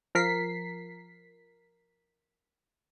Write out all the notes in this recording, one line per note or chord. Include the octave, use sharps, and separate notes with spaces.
F3 A#4 B6 C7